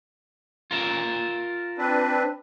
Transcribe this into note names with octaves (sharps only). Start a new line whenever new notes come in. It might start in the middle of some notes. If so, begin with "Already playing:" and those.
F4 A#4 E5
C4 D4 B4